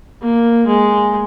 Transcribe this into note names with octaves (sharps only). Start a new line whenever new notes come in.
A#3
G#3